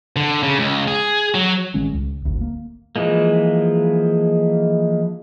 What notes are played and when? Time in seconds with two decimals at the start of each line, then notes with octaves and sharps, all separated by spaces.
0.16 D3
0.43 C#3
0.59 C#2
0.88 G#4
1.35 F#3
1.74 A1 D#3 G#3 C#4
1.94 C#2
2.25 D1 G#1 D2
2.41 A#3
2.96 E3 F3 G#3 A#3